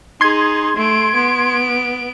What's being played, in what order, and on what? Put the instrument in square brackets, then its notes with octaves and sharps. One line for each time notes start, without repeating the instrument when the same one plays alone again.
[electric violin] D#4 G#4 [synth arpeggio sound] C6 G#6
[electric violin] A3 D7
B3 D7